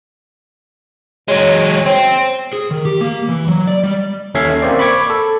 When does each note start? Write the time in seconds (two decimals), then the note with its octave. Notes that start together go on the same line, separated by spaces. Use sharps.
1.28 F#3 G#3 C#5
1.86 C4
2.53 G#4
2.71 D#3
2.85 G4
3.01 A#3
3.29 E3
3.48 F#3
3.67 D5
3.83 G3
4.34 D#2 C#4 A4 E5 G#6 C7
4.62 A#3 C4 C5 D5
4.79 B5 C#6 D6 G#6
5.10 A4